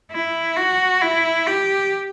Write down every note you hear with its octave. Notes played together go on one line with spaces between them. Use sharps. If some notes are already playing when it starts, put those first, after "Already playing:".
E4
F#4
E4
G4